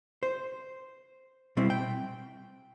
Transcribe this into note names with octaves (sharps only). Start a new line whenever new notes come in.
C5
B2 G3 C4 E4
G5